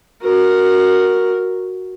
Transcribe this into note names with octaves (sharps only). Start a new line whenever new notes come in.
F#4 A#4